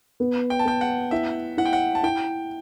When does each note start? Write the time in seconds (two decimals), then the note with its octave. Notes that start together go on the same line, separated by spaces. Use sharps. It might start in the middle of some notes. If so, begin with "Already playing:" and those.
0.20 B3
0.50 G5
0.59 A5
0.65 B3 G5
0.81 F#5
1.11 E4 E5
1.57 E4 F#5
1.66 G5
1.73 F#5
1.95 A5
2.03 E4 G5